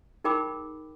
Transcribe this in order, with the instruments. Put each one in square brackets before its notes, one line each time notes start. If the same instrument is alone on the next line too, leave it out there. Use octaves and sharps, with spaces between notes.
[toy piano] D#4 G#4 A#4 G5 B5 D6